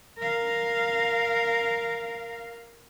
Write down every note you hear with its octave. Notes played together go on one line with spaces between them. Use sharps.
A#4 F5